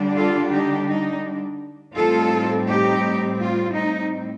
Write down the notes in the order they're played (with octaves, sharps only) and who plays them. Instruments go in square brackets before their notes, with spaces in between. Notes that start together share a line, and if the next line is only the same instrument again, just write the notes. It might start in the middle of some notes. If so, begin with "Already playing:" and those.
Already playing: [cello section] D3 G3 D4
F4 A4
D#4 G4
D#4
A2 G3 C4 D#4 F4 A4
D#4 G4
F4
D#4